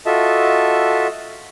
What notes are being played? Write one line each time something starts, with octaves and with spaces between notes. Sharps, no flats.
F4 F#4 A4 D#5 E5 A5